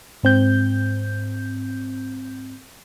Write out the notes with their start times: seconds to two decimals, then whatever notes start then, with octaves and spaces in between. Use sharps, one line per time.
0.23 G#2 C4 G6